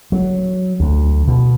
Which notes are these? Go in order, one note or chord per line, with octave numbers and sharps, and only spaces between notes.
F#3
D2
B2